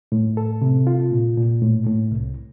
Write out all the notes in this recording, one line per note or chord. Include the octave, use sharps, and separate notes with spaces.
A2
A4
C3
F4
A#2
A#2
A2
A2
C2